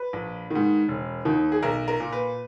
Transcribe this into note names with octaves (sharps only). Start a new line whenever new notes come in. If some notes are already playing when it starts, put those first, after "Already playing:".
Already playing: B4
A#1
G#2 D#3
E1
D#2 D#3
G#4
B1 A#4
A#4
A#2
B4